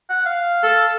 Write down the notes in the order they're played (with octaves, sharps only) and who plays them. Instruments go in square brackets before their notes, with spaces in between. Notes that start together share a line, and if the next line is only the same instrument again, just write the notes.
[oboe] F#5
F5
[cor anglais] A4